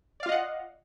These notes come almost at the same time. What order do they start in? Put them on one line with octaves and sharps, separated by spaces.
D5 F5 F4 D#5 F#5